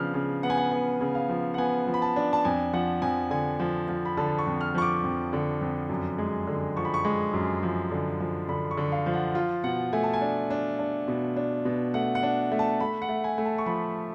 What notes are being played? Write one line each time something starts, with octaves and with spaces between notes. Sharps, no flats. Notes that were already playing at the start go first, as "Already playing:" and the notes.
Already playing: C#3 F3 B3 D4 F6
C#3
B3 F#5
G#5
F#5
B3 F#5
C#3
F5
F3
F#5
B3 G#5
F3
B5
A5
D4
A5
F2 G#5
F3 F#5
F2 G#5
D3 G#5
F3
F3
B5
D3 A5
C#6
F2
F6
F3 C#6
D6
F2
D3
F2
F#2
G#3
D3
F3 C#6
B5
C#6
G#3
F#2
F3
D3
F3
D3 B5
C#6
D3
F5
F3
F#5
F4
B2 F#5
A3 G#5
A5
G#5
D4
D4
D4
B2
D4
B2
A3 F#5
F#5
D4
A3
A5
A3 B5
F#5
A3
G#5
A3
A5
C#6
F3 B5